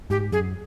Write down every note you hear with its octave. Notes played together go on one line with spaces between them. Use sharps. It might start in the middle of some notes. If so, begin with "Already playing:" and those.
G#2 G4
F#2 G#4